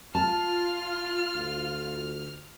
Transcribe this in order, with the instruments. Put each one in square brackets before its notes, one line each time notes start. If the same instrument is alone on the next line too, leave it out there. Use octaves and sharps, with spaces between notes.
[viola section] F4 [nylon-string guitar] A5 [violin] F6
[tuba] D2